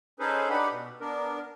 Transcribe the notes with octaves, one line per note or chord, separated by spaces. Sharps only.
C#4 D#4 G#4 A4 B4 C5
D4 D#4 G4 B4 F#5 B5
B2
B3 D4 A#4